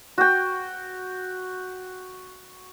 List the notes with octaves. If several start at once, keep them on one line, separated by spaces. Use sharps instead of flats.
F#4 G5